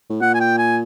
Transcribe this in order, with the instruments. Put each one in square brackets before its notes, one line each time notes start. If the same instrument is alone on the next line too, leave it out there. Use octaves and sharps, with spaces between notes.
[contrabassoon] A2
[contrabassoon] A#2 [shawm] F#5
[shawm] G#5
G5
G#5